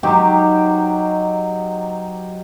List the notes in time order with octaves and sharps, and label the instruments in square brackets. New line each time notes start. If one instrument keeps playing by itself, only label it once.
[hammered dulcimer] F#3 D#4 G4 C5